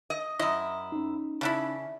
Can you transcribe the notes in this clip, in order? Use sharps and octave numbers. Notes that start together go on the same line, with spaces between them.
D#5
F#2 E4 D#5
C#4 D#4
C#3 E3 D4 E4